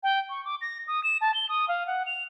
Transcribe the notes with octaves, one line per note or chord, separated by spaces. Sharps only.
G5
C#6
D6
A#6
D#6
E7
A5
G7
D#6
F5
F#5
F7